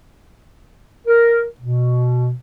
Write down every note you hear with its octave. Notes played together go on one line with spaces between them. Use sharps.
A#4
B2